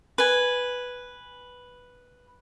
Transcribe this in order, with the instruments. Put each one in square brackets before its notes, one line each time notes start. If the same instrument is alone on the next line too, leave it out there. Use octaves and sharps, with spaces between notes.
[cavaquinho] B4 G#5